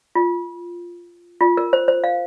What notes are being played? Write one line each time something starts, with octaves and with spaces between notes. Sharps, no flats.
F4
F4
A#4
C5
C5
F5